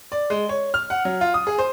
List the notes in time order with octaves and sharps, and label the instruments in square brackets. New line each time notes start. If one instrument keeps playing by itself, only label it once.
[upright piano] D5
G#3
C#5
F6
F#5
F#3
F4
D#6
G#4
C5